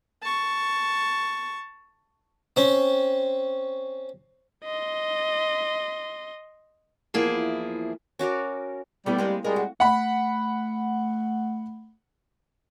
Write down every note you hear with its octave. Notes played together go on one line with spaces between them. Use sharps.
A5 C#6
C4 C#4
D#5 C6
E2 F3 A#3 E4 G#4
C#4 F#4 A#4 D5
G3 A3 B3 E4
G#3 A#3 C4
G3 G#3 A#4
F#4
A3 F#5 B5